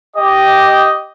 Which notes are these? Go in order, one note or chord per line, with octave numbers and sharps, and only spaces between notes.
G4 D#5